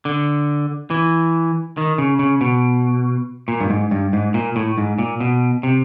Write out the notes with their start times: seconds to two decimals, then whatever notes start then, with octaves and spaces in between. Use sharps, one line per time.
0.05 D3
0.90 E3
1.77 D#3
1.98 C#3
2.19 C#3
2.41 B2
3.48 A#2
3.60 G2
3.70 G#2
3.91 G2
4.13 G#2
4.34 A#2
4.56 A2
4.78 G#2
4.98 A#2
5.20 B2
5.63 C3